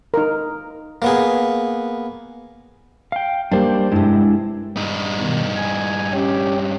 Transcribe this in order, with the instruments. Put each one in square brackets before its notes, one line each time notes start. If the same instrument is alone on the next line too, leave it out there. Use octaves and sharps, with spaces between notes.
[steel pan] D#4 A#4
[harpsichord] A#3 B3 G#4
[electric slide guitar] F5 G5
[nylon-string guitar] G3 A#3 [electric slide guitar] D4 C5
[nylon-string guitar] G2 C3 [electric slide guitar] G#3 D4 E4
[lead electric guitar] G2 D#4
[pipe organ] B2 D#3
G#5
C#4 G4